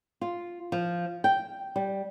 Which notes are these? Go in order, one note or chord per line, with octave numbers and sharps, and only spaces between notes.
F4
F3
G5
G3